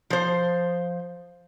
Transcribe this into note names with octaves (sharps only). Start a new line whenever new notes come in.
F3 C5